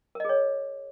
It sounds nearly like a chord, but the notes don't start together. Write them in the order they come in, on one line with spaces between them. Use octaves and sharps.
A#4 D#5 G#4 C#5